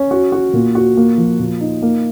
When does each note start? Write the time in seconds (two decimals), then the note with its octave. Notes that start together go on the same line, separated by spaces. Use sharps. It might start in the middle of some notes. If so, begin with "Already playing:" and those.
Already playing: C#4
0.11 F#4
0.32 F#4
0.53 A#2
0.75 F#4
0.97 A#3
1.18 F3
1.40 A#2
1.61 D#4
1.82 A#3